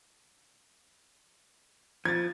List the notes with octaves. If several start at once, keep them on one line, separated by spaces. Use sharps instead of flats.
F3 G#6 A6